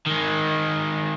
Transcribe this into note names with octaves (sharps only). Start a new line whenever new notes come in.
D#3 G#3